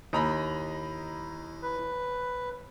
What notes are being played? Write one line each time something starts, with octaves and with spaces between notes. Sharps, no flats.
D#2 E4 D#5 A#5 B5
B4